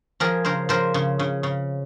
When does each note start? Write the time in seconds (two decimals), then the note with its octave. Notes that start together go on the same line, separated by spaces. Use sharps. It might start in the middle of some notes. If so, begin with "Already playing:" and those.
0.20 F3 G#4 A#4
0.45 C#3 A#4 C5
0.69 F3 A#4 C5
0.94 C#3
1.19 C#3
1.43 C#3